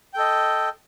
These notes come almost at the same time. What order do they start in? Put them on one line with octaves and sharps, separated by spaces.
G5 A4 D#5